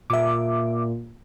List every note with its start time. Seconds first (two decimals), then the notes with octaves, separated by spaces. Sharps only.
0.10 A#2 E5 D6